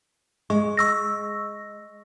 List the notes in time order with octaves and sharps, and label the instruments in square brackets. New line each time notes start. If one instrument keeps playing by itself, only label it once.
[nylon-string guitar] G#3 [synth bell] C#6
[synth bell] C#6 E6 A#6